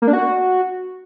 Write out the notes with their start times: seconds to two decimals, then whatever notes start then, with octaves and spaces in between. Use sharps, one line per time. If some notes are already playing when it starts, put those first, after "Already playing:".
0.02 A#3
0.08 D4
0.13 F#4